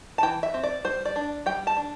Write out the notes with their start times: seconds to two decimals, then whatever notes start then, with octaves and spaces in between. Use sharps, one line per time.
0.18 A5
0.23 E3 G5
0.43 E5
0.54 C4
0.63 D5
0.84 G3 C5
1.05 D5
1.16 D4
1.46 G3 G5
1.67 A5
1.77 D4